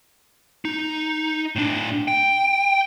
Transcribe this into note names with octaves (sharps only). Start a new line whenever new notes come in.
D#4
A2 D4
G5